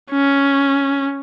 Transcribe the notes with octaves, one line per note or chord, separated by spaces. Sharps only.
C#4